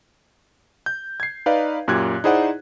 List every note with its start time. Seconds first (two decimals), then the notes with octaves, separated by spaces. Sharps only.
0.86 G6
1.20 G#6 C7
1.46 D#4 B4 D5 F5
1.88 F#2 A#2 G4 F#6 G#6
2.24 D#4 E4 G#4 C5 D5 F#5